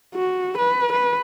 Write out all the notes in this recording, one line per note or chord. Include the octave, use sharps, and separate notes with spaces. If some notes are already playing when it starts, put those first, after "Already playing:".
F#4
B4
B4